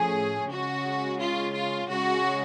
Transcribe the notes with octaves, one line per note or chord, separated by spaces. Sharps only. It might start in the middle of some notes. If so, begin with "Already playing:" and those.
Already playing: A2 F3 A3 C#4 G#4
C#3 G#3 C#4 F#4
F4
F4
C#3 G#3 C#4 F#4